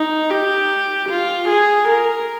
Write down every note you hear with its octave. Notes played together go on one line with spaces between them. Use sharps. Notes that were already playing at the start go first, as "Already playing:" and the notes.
Already playing: D#4
G4
F4
G#4
A#4